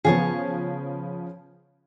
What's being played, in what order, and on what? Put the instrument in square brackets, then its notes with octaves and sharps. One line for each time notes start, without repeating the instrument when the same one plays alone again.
[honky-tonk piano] C#3 F3 B3 [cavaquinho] G#4 C#5 A5